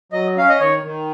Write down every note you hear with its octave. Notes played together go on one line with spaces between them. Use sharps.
F#3 D#5
C#4 F5
D#5
D#3 C#5
D#3